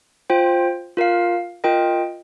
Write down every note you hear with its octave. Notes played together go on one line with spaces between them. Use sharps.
F4 C5 G5
F4 A#4 F5
F4 A#4 D#5 G5